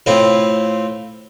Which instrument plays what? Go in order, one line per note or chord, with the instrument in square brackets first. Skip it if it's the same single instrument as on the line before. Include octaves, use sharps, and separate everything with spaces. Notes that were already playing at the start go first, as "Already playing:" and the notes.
[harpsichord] A2 C4 E4 F4